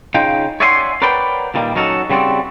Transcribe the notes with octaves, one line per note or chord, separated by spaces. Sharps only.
C#3 D#4 F4 G5
C#5 D5 E5 F#5 G#5 C6
A#4 B4 C#5 D5 F#5 G5
A#2 D3 D#3 G3 A#3
F#3 C#4 D#4 F#4 A4
C#3 G3 C4 F#4 D5